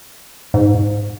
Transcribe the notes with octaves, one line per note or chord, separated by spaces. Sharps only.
G#2